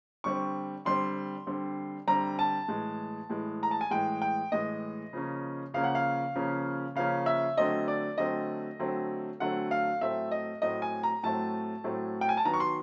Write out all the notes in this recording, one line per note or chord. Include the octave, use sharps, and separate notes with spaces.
D3 G3 C4 C#6
D3 G3 C4 C6
D3 G3 C4
D3 G3 C4 A#5
A5
A2 E3 G#3
A2 E3 G#3
A#5
A5
G#5
A2 E3 G#3 G5
G5
A2 E3 G#3 D#5
C#3 F3 A#3 C#4
C#3 F3 A#3 C#4 F5
F#5
F5
C#3 F3 A#3 C#4
C#3 F3 A#3 C#4 F5
E5
D3 F#3 A3 C4 D#5
D5
D3 F#3 A3 C4 D#5
D3 F#3 A3 C4
D3 F#3 A3 C4 F#5
F5
A2 F#3 A3 C4 E5
D#5
A2 F#3 A3 C4 D#5
G#5
A#5
A2 F#3 A3 C4 A5
A2 F#3 A3 C4
G5
G#5
A5
D#3 F#3 B3 A#5
C#6
C6